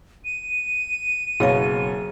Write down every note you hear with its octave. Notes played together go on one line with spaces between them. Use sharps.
D#7
F#1 B2 G#4 C#5 F5